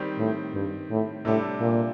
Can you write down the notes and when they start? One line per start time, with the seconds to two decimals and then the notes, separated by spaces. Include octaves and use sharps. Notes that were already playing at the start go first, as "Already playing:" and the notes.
Already playing: D#3 G3 C4 G4
0.18 A2
0.54 G2
0.90 A2
1.25 A2 C3 G3 D4 A4
1.60 A#2